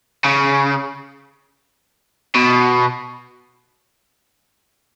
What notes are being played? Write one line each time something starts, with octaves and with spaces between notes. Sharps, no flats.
C#3
B2